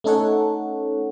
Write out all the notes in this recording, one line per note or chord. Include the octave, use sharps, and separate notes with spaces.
A3 C#4 D#4 A4 C#5 F#5